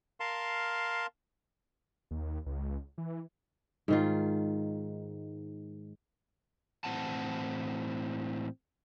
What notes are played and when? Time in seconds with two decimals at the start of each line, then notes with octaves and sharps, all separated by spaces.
0.20 A#4 F5 A5 C6
2.11 D#2
2.46 C#2
2.98 E3
3.88 G#2 D#3 F4
6.84 A2 E3 C4 F#5 A5